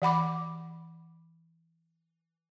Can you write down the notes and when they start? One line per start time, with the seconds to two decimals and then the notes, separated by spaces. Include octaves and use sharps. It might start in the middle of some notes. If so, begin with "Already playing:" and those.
0.02 E3 F#5 B5 D6